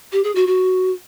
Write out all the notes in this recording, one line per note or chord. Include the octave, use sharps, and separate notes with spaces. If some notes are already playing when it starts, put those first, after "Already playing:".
G4
G#4
F#4
F#4